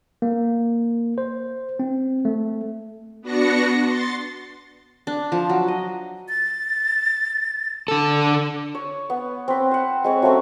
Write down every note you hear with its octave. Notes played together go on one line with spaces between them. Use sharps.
A#3
C5
C4
A3
B3 D4 F#4 A#6 C#7
C6 A6
D4
F3
F#3
D#5
A6
D3 A4
C#5
B3
C4 B4
C5 F#5
G#3 C4 C#5
F#3 A3 C4 C#4